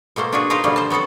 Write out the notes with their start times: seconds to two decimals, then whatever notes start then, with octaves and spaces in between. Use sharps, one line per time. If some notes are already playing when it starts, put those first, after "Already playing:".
0.16 B2 A3 A#3 C5
0.32 D4 F4 F#4 G#4
0.50 D#4 F4 A#4 C5 F5
0.64 B2 D3 F3 G3 A3 A#3
0.76 C5 A5
0.90 F#3 B3 C4 A4 F#5